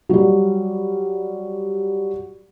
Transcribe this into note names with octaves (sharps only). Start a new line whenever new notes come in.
F#3 G3